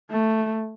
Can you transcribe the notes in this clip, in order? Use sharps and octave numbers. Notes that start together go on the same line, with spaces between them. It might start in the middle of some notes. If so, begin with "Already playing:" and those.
A3